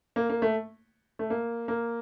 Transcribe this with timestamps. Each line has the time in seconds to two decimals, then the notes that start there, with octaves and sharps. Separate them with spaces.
0.16 A#3
0.30 A#3
0.42 A3
1.19 A3
1.30 A#3
1.68 A#3